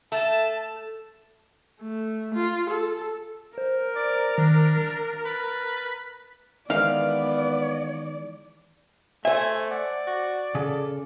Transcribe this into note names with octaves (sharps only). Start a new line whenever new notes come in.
A3 A5
A3
F4
A4
A#4 C5
D5
D#3 D4
A6
B4
D#3 E3 G#3 B3 D5 F5
A3 C5 E5 G#5
D5 F#5
F#4
C#3 A4